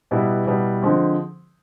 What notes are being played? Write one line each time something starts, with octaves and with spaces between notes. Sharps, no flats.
B2 G3 B3 E4
B2 G3 B3 E4
D3 F3 G#3 C4